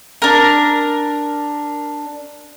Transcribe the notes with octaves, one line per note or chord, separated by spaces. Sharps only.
D4 A#4